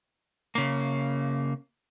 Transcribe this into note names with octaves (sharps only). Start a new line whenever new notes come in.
C#3 A#3